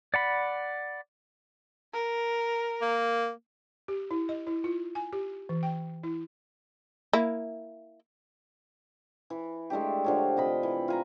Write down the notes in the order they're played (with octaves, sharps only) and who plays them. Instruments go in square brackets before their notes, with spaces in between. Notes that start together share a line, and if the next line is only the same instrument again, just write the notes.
[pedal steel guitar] D5 F#5 B5
[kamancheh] A#4
[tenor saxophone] A#3
[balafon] G4
E4
D#5
E4
F4
G#5
G4
E3
G5
E4
[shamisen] A#3 E4
[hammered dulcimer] E3
G#3 A3 D4 G4
D3 F3 C#5
C3 D#5 B5
E3
F4 G#5 A#5